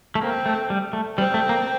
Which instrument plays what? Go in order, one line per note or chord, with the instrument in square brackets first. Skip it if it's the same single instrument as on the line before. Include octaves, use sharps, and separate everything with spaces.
[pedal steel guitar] A3
[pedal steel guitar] A#3 [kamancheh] C4
[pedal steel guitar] A3
G3
A3
[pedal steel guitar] G3 [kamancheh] C4
[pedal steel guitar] A3
A#3